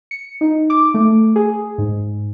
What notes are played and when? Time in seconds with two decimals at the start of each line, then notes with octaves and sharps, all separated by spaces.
0.11 C#7
0.41 D#4
0.70 D6
0.94 A3
1.36 G#4
1.78 G#2